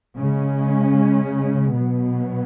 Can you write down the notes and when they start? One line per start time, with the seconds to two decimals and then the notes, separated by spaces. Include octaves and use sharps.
0.15 C#3 G#3 C#4
1.73 B2 F#3 B3